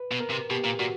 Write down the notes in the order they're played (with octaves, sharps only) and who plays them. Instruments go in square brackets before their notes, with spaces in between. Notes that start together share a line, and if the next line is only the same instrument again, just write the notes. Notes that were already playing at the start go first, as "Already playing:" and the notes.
Already playing: [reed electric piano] B4
[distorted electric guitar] B2
[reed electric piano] A#4
[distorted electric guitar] C3
[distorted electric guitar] B2 [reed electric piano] G4
[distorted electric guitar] A#2
[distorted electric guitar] A#2 [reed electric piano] F#4